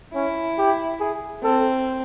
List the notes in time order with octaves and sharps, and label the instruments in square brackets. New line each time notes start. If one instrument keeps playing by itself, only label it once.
[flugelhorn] C#4 [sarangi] E4
[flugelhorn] G4
G#4
[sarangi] C4 [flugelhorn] A4